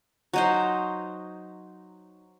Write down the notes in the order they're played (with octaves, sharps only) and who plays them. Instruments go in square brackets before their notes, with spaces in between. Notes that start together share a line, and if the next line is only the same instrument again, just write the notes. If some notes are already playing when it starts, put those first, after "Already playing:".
[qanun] F#3 D#4 C5